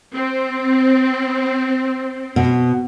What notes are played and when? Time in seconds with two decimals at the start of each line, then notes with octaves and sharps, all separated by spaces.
0.13 C4
2.36 B2